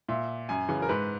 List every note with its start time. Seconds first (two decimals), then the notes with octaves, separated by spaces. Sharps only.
0.09 A#2 E5
0.49 F#2 G#5
0.68 C#3 E3 G#5
0.82 A#4
0.89 G#2 B4